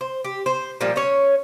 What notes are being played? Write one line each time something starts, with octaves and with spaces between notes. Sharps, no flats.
C5
G4
C5
A#2 F3 G3
C#4 C#5